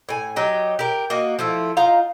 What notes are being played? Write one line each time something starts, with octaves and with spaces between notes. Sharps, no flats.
A2 G#5
F#3 D#4 G4
G4 A#4
A#3 F#4 D#5
F3 A3 E4
D#4 F4 F5 A#5